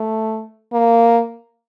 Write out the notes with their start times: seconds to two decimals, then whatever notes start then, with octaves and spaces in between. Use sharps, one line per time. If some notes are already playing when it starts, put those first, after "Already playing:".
Already playing: A3
0.73 A#3